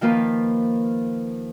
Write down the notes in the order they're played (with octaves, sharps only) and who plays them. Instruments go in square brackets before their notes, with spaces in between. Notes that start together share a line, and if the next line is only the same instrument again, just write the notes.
[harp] D#3 F3 A#3 F4 B4